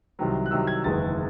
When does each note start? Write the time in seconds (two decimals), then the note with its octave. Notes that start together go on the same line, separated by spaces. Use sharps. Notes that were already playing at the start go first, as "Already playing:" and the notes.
0.19 C2 C3 D#3 F#3
0.46 F#6
0.51 C2 C3 D#3 F#3 E6
0.67 G#6
0.84 F#1 E2 D#3 G#3 A6